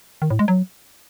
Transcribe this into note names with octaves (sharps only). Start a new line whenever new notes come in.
D#3
A2
G#3
F#3